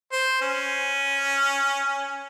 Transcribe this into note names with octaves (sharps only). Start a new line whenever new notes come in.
C5
C#4